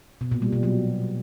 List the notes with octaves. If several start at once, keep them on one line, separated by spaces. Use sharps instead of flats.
B2
A#2
G3
B2
F#3